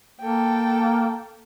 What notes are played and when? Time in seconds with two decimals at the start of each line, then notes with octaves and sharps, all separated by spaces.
0.21 A#3 A4 G5